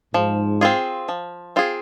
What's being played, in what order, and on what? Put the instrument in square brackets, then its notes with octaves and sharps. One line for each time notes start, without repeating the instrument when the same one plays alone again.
[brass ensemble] G#2 [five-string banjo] F3
[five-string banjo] C4 F4 G#4
F3
C4 F4 G#4